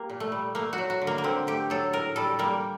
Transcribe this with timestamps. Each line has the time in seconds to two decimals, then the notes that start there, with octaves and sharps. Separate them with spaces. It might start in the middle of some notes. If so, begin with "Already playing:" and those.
Already playing: A#3 G4
0.10 A#2
0.20 A3
0.32 G3
0.55 A3 A#3
0.73 F#4
0.78 F#3
0.90 F#4
1.02 D3
1.07 A#3
1.18 A#3
1.24 D3 C4
1.47 A3 G4
1.70 F#3 A4
1.93 A2 A#4
2.16 G3 A4
2.39 G3 A#3